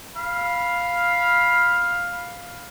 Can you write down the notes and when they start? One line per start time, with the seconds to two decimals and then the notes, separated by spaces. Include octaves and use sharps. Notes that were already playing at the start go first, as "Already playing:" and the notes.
0.16 F5 B5